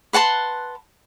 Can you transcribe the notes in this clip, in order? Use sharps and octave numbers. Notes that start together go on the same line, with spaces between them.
B4 F#5 A5 C6